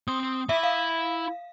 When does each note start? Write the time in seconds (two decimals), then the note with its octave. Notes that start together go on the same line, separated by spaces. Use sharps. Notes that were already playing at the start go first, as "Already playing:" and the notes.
0.08 C4 C6 D#6
0.49 E4 E5 B6
0.63 F5